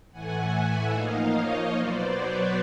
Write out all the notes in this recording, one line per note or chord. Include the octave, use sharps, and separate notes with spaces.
A2 E3 A3 F#5 G#5
E5 F#5
F3 A#3 D#4 D#5 F5
C#5 D#5
B2 F#3 B3 C5 D5
B4 C#5